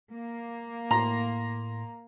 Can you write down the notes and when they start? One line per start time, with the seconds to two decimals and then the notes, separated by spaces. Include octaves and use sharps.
0.10 A#3
0.91 A2 A#5 C6